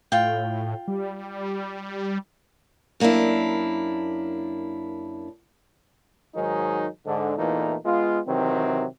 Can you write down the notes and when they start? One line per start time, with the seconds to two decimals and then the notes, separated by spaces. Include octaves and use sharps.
0.12 A2 F4 G5
0.88 G3
3.00 F#2 A#3 B3 D4 E4
6.35 G#2 D#3 F#3 D#4 G#4
7.06 G#2 D3
7.37 E2 A#2 E3 A3 D#4
7.84 G#3 B3 F4
8.27 C3 D#3 E3 F#3 C4